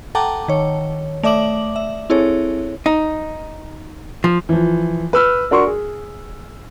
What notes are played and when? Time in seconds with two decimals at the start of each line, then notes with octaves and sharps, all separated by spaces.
0.15 A4 F#5 G5 A5 A#5 D6
0.48 D#3 C#5
1.23 A3 D5 E5 D6 F#7
1.76 E5
2.10 C4 E4 G#4 A4 C#5
2.86 D#4
4.24 F3
4.49 E3 F3
5.13 B4 E6 F6
5.51 D4 F#4 A#4 C6 C#6
5.67 G#4